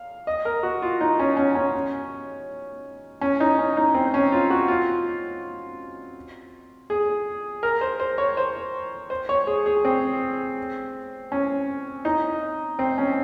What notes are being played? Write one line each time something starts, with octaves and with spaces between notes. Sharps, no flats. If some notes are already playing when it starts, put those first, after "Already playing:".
Already playing: F5
D#5
A#4
F#4
F4
D#4
C#4
C#4
C#4
C#4
D#4
C#4
D#4
C4
C#4
F4
F#4
F4
G#4
A#4
C5
C5
C#5
C5
C5
C#5
G#4
G#4
C4
C#4
D#4
C4
C#4